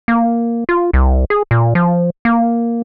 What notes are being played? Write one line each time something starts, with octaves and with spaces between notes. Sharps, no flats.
A#3
F4
C2
G#4
A#2
F3
A#3